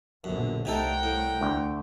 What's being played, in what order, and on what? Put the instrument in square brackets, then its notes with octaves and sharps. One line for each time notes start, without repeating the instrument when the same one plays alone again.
[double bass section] A#1 B2 D3 [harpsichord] F#2
[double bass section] C2 A3 [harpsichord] C3 D#4 A4 [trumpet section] A#4 F#5 G5
[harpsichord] A2
[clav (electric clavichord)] D2 [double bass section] A3